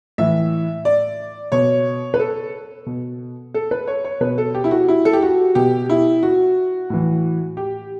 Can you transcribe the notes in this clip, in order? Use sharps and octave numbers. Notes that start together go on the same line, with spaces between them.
A2 E3 E5
D5
B2 C#5
B4
A4
B2
A4
B4
C#5
C#5
B2 B4
A4
G4
E4
F#4
E4
A4
G4
F#4
B2 G4
E4
F#4
A2 E3
G4